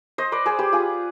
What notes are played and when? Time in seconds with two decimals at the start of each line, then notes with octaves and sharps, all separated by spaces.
0.18 C5 D#5
0.32 B4 D5
0.46 G#4 C5
0.59 G4 B4
0.73 F4 G#4